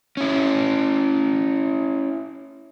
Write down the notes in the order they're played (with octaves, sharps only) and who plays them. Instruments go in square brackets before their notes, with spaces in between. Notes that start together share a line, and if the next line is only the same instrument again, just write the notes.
[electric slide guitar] C#4 E4